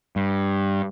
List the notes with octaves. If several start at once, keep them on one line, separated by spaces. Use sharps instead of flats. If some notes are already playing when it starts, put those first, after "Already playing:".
G2